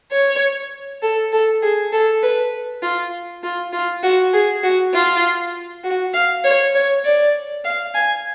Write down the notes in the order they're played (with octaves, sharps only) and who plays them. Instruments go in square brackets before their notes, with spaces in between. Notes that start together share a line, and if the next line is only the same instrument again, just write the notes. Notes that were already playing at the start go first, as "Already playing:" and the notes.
[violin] C#5
A4
A4
G#4
A4
B4
F4
F4
F4
F#4
G#4
F#4
F4
F#4
F5
C#5
C#5
D5
F5
G#5